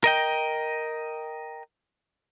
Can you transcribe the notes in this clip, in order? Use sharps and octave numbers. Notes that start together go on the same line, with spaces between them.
A#4 D#5 G5